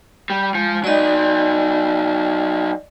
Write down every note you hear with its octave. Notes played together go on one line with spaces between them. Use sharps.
G3
F3 G#3
F#3 D#4 D5 D#5